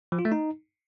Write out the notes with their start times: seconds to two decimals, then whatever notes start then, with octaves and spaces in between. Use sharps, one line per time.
0.12 F3
0.19 F4
0.25 A3
0.32 D#4